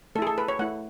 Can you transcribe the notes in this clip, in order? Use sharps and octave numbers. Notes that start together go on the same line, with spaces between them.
A3 E4 G#4 A4
A4
B4
C#5
A3 E4 F#5